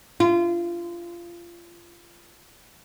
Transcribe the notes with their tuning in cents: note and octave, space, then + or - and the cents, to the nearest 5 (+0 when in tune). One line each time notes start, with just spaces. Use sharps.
F4 -25